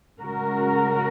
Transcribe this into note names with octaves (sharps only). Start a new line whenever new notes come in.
C#3 G#3 F#4 A#4